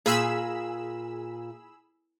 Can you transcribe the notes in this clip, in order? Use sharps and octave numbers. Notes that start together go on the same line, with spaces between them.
A#2 G#4 B5 E6